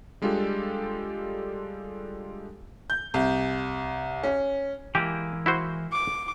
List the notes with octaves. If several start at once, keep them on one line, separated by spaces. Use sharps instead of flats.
G3 G#3 D4 F4 G4 A4
G6
C2
C#4
E3 G#3 A#3 G4
E4 F#4 C5
D6